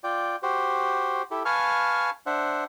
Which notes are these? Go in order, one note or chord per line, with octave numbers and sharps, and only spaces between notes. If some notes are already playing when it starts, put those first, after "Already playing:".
F4 D5 G5
F#4 G4 C5
E4 G4 A4
B4 F5 G#5 A5 C#6 F6
D4 C5 E5 F#5